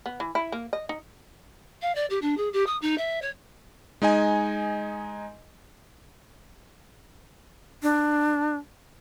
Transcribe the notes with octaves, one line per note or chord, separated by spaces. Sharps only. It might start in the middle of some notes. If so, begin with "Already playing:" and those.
B3
E3
E4
A#3
D#5
D#4
F5
D5
G4
D4
G#4
G4
D#6
D#4
E5
C#5
G#3 D#4 D#5 G#5
D4